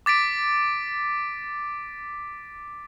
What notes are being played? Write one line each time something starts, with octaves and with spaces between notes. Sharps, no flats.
D6 A6 B6 D7